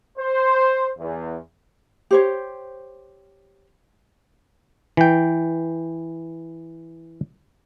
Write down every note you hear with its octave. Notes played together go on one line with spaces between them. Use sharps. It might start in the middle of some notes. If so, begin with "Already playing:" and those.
C5
E2
G4 C5 C#5
E3 G5